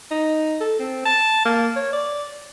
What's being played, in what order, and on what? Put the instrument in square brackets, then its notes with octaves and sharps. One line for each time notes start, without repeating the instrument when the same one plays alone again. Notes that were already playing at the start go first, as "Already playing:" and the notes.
[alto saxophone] D#4
A4
C4
A5
A#3
C#5
D5